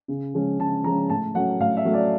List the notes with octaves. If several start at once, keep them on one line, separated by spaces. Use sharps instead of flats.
C#3
F3 G#3 C#4
C#3 A5
F3 G#3 C#4 A#5
A2 A5
F#3 A3 C#4 F#5
A2 F5
E5
F#3 A3 C#4
D5